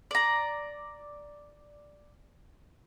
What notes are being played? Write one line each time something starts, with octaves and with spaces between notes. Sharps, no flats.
D5 A#5